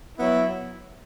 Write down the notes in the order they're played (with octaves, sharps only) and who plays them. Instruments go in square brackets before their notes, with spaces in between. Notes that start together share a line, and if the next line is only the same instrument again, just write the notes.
[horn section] F#3 B3 E4